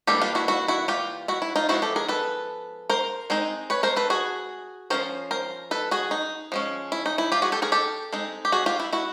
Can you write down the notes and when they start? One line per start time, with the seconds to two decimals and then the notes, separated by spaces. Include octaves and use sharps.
0.07 E3 G3 A#3 D4 G4 A4
0.22 F4 G4
0.35 E4 F#4
0.48 E4 F#4
0.68 E4 F#4
0.88 F4 G4
1.28 E4 F#4
1.42 E4
1.56 D#4 F4
1.69 F3 G#3 B3 E4 F#4
1.82 G4 A4
1.96 G#4 A#4
2.08 A4 B4
2.90 A#4 C5
3.30 G#3 C4 D#4
3.70 B4 C#5
3.83 A#4 C5
3.96 A4 B4
4.10 F#4 G#4
4.90 F3 G#3 C#4 A#4 C5
5.31 A#4 C5
5.71 A4 B4
5.91 F#4 G#4
6.11 D#4
6.52 F3 G#3 C#4
6.92 E4
7.06 D#4
7.18 E4
7.32 F4 G4
7.42 F#4 G#4
7.52 G4 A4
7.62 G#4 A#4
7.72 G4 A4
8.12 G#3 C4 D#4
8.45 G4
8.52 F#4 G#4
8.66 F4 G4
8.80 E4
8.93 E4 F#4